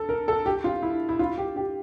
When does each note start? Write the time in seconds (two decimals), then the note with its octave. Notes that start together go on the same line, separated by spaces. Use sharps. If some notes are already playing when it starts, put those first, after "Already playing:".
Already playing: A4
0.09 A#4
0.28 A4
0.46 G4
0.64 F4
0.83 E4
1.09 E4
1.19 F4
1.38 G4
1.56 G4